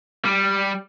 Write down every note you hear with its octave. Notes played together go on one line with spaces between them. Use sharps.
G3